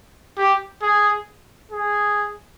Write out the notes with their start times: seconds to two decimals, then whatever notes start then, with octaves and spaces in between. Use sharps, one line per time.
0.38 G4
0.82 G#4
1.72 G#4